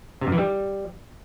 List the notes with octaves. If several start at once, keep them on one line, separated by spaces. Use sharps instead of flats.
C3
F#2
E3
G3